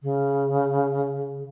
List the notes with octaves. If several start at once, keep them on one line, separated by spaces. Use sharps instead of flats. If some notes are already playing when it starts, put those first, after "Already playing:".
C#3